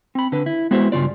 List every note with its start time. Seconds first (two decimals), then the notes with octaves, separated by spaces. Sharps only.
0.15 C4 B5
0.32 D3 B4
0.46 E4
0.71 G#3 B3 E4 F#4 C5 E5
0.92 G2 C#3 F4 D5